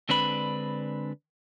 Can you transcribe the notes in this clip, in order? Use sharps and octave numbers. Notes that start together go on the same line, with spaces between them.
D3 G#3 C4 D4 B4 B5